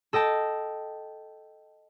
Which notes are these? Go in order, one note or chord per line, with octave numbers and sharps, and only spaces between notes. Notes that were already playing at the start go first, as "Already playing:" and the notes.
A4 D#5 G5 A5